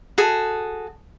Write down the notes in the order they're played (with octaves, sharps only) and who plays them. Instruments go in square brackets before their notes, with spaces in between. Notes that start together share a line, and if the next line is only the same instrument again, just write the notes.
[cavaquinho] F#4 G#4 A4